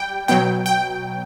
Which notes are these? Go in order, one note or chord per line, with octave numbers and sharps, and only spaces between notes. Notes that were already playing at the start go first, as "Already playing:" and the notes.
Already playing: G3 G5
B2 F#3 G5
G5